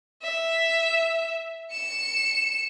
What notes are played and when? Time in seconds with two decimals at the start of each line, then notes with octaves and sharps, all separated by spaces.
0.22 E5
1.72 C#7 E7